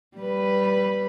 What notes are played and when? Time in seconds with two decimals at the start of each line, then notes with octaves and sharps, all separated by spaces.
0.18 G3 B4